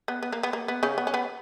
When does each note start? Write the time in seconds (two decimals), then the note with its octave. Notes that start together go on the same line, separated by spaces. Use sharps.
0.08 B3
0.23 B3
0.32 A#3
0.43 B3
0.53 A#3
0.68 B3
0.83 C#3 C#4
0.98 B3
1.07 C#4
1.14 B3